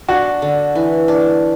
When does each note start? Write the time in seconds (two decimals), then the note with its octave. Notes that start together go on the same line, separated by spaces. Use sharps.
0.09 D4 F#4
0.42 D3
0.75 E3
1.08 D4